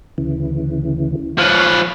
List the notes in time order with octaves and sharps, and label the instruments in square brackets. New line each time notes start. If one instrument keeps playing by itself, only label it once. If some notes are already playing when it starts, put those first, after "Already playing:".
[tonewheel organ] D2 C#3 E3
[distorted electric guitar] F3 B4 [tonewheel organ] C#5 F5